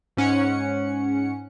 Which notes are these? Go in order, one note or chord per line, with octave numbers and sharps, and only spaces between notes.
G#2 C#4 F#5 C#7